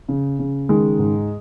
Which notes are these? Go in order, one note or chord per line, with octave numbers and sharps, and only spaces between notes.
C#3
C#3
D#3 G#3
G#2